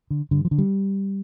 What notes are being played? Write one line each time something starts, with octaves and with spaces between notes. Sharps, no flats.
D3
G2 D3
F3
D3
G3